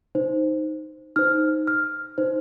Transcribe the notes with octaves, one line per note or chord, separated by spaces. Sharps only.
D#4 C5
D#4 C5 F6
F6
D#4 C5